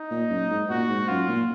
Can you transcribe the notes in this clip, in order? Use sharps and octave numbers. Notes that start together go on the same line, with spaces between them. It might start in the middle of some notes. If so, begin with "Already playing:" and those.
Already playing: D#4
A#2
F#2
G#2
A#2 F#4
G#2
F#2 F4
A#2